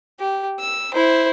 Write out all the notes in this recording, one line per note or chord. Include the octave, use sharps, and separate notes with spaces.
G4
E6
E4 C5